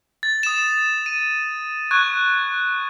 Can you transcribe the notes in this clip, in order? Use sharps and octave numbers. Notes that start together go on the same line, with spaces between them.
A6
D#6 E7
D#7
C#6 F#6 G#6